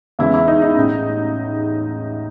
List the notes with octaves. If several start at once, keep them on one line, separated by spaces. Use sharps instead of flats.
E2 C#3 E3 G#3 E4
E4
D#4
D#4
A1 A2 G#3